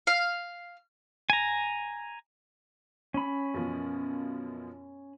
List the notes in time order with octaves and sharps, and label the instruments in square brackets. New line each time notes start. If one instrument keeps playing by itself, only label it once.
[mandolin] F5
[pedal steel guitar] G#5 A#5
C#4 B5
[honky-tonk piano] F#2 B2 F3